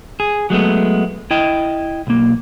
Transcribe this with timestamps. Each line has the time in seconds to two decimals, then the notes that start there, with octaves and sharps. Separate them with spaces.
0.20 G#4
0.50 F#3 G#3 A3 B3
1.31 E4 D#5 G5
2.07 B1 A#3